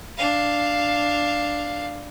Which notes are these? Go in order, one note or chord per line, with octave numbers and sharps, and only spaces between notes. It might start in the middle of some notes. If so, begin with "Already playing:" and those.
D4 F5